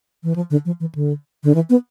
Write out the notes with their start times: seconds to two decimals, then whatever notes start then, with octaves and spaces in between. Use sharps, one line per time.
0.24 E3
0.36 F3
0.50 D3
0.65 F3
0.80 E3
0.95 D3
1.44 D3
1.55 E3
1.70 B3